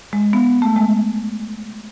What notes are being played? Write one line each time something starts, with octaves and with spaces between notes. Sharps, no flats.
G#3
B3
A3
G#3